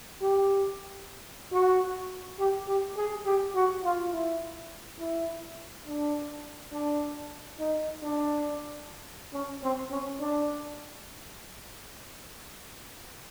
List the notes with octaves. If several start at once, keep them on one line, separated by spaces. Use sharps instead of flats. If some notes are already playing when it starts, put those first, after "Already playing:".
G4
F#4
G4
G4
G#4
G4
F#4
F4
E4
E4
D4
D4
D#4
D4
C#4
C4
C#4
D4